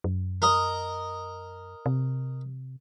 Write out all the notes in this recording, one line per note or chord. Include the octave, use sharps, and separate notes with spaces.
F#2
A#4 D#5
C3